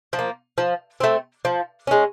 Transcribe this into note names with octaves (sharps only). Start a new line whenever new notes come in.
F3
A#3
F3
A3 C4
F3
G#3 C#4